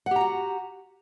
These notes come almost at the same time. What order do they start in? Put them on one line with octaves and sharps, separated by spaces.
F#5 G4 A#5 F#4